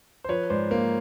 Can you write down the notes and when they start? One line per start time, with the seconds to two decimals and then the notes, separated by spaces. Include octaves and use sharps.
0.24 C5
0.29 F3 B4 C#5
0.50 G#2 C5 D5
0.71 A#3